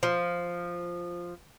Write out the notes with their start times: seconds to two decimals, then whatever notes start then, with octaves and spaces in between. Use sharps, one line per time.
0.03 F3